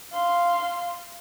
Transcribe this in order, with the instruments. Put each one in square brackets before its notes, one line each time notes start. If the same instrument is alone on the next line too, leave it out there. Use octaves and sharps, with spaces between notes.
[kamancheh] F5 C6